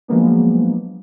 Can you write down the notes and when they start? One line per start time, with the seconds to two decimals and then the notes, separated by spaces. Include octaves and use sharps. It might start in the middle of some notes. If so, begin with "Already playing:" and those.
0.08 F3 F#3 G#3 A#3 B3 D4